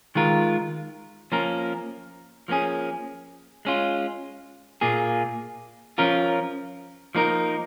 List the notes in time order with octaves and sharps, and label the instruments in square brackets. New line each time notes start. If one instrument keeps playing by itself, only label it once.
[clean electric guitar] D#3 G#3 F4 A#4
F3 A#3 C#4 A#4
F3 A#3 C#4 G#4
G#3 C#4 F4
A#2 A#3 F4 G#4
F3 C#4 F4 A#4
F3 A#3 D#4 A#4